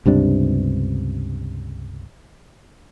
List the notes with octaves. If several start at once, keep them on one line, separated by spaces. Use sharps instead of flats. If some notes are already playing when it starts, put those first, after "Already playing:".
C#2 G2 C3 D4